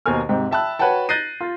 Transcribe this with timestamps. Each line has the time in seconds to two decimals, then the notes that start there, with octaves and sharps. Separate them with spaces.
0.06 D#2 B2 A#4 C5 G#5 F6
0.29 G#2 C3 G5
0.51 E5 G5 A5 B5 E6 F#6
0.79 F#4 B4 C#5 F#5 G5 A5
1.09 F#6 G6 A6 A#6 C7 D#7
1.41 F4